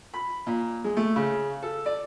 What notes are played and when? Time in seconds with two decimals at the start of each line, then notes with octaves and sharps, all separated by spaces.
0.14 B5
0.47 A#2
0.84 G#3
0.97 A3
1.16 C#3
1.63 A4
1.86 D5